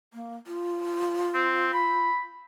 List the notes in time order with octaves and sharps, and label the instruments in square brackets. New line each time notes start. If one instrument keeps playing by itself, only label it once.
[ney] A#3
F4
[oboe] C4
B5